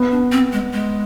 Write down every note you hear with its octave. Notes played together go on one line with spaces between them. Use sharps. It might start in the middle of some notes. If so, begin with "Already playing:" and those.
Already playing: B3
D4
C4
G#3
G#3